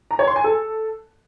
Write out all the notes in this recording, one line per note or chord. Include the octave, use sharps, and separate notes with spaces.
A#5
C#5
C6
G#5
A4